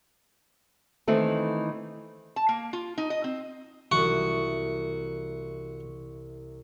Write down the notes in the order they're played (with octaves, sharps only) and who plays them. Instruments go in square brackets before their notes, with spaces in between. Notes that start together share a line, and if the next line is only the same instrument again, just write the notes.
[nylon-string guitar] D#3 E3 A3 C4
[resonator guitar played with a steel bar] A5
A#3
F4
D#4
D#5
C4
[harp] C2 E3 [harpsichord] F#4